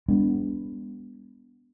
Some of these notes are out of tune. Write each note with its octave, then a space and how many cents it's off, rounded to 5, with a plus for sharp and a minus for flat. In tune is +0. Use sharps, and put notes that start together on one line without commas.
G#3 -45 B3 +0 D4 -20